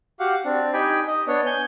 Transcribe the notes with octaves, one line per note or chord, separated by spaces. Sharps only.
F#4 G4 F5 F#5
C4 D4
D#4 G4 G5 G#5 B5
D#5
B3 D4 C#5
G#5 G6